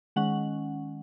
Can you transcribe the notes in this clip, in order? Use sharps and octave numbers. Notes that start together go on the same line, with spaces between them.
D#3 G#3 C#4 F#5